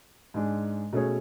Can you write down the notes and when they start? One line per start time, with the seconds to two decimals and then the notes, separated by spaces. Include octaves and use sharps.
0.34 G#2 G#3 D4
0.92 B2 A3 C#4 G#4 C#5